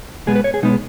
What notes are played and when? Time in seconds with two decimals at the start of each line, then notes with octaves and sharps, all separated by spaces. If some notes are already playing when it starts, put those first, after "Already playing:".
0.27 B2 G#3 B3 G#4
0.36 B4
0.44 C#5
0.54 G#4
0.63 B2 G#3 B3 D#4